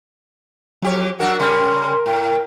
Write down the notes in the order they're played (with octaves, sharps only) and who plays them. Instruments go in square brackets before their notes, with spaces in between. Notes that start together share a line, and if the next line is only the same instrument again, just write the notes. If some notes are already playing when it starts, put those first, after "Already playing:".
[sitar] F2 G4 C#5 [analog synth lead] F#3
[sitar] F#3 D4 F#4 [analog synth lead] A#4 [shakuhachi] F#5
[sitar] C#3 G3 C#4 [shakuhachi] C6
[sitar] A2 [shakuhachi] G5